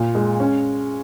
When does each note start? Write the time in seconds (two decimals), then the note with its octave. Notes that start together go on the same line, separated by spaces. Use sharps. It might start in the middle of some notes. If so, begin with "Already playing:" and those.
Already playing: A#2
0.15 G#3
0.40 C#4